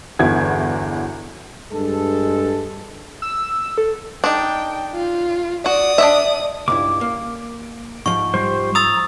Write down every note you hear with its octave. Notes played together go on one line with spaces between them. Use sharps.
G1 E2 E4 F#4 G#6
G2 G#3 A4
E6
A4
D4 D#4 G5
F4
F#4 D5 D#6
D4 D#5 E5
C#2 G2 E4 D6
A#3
G#2 F3 C#6
G3 C5
A#5 D#6 E6 A6